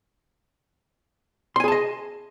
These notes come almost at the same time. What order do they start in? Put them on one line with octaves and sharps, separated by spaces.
C6 G#5 G#4 A5 D#5